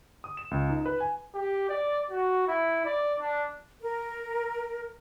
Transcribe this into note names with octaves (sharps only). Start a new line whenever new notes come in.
D#6
E7
C#2
D#4
B4
G#5
G4
D5
F#4
E4
D5
D4
A#4